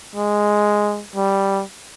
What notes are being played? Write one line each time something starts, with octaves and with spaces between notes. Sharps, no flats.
G#3
G3